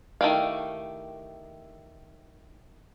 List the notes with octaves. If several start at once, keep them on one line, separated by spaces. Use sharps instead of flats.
D#3 A3 E4 G4 F5